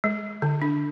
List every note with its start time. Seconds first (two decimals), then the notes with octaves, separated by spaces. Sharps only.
0.04 G#3
0.42 D3
0.62 D4